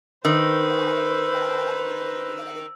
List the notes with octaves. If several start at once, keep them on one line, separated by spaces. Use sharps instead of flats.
D#3 B4 C5 E6